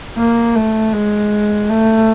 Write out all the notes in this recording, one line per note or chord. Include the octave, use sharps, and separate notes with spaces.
A#3
A3
G#3
A3